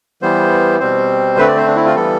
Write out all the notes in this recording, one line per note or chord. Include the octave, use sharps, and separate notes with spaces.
E3 G3 B3 C5
B2 G3 C4 C5
D3 A3 C4 B4
D5
C5
D4
E4
F4
E3 G3 B3 A4